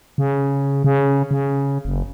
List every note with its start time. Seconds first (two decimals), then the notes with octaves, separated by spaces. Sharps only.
0.18 C#3
0.84 C#3
1.31 C#3
1.85 F#1